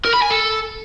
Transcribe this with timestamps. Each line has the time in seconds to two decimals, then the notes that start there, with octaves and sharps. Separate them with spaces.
0.05 A#4
0.13 B5
0.22 G#5
0.30 A4